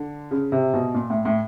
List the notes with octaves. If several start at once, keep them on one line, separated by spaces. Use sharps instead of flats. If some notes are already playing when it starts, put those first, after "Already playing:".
Already playing: D3
C#3
C3
B2
A#2
A2
A2